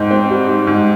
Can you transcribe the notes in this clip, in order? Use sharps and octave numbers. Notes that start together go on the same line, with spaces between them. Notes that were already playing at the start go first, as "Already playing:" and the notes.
Already playing: G#2 C4 D#4
C4
G3
D#4
G#2